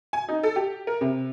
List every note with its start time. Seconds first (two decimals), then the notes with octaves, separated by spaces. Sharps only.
0.13 G#5
0.29 D#4
0.43 A4
0.56 G4
0.87 A#4
1.01 C3